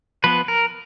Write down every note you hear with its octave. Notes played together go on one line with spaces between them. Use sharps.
F3 B3 B4
A#4